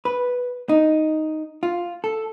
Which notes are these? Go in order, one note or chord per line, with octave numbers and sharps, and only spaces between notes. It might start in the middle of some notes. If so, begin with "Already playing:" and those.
B4
D#4
F4
A4